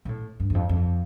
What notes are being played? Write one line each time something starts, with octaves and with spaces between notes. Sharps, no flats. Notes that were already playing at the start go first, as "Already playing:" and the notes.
B2
A2
G2
E2
F2
F2